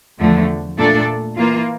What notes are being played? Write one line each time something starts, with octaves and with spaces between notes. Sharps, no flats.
E2 D3 F3 A3
A#2 A3 D4 A4 D5
E3 A#3 F4